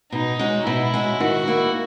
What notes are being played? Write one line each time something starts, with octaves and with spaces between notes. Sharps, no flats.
B2 D#4
G#3 C#4 F#4
B2 E4
G#3 C#4 F#4
D#3 F#4
A#3 E4